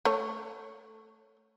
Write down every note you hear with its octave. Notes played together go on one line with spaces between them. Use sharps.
A3 C#5